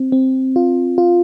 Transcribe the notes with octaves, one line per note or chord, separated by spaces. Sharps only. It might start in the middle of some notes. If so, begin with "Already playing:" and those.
Already playing: C4
C4
F4
F4